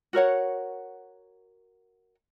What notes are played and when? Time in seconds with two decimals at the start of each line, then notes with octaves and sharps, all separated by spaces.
0.13 F#4 A#4 C#5 F#5